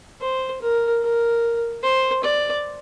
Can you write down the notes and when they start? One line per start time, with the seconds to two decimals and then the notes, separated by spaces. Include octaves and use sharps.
0.21 C5
0.62 A#4
1.02 A#4
1.83 C5
2.24 D5